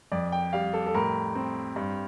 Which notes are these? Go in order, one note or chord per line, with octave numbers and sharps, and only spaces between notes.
F2 D5
G5
G3 F5
A4
A4
A2 A#4
C4
G2